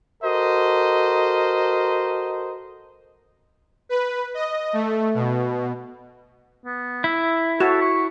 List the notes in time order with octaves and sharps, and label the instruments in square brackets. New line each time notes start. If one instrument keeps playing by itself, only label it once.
[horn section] F#4 A4 A#4 C5 D#5
[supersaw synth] B4
D#5
A3
B2
[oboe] B3
[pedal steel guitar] E4 [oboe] E5
[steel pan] F#4 [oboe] A4
[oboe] C#6